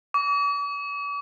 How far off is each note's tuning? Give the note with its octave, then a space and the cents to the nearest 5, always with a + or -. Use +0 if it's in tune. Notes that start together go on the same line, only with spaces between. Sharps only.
D6 -45